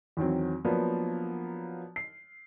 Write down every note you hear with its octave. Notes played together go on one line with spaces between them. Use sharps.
E2 D#3 F#3 C4
F3 F#3 A#3 B3 D4
C7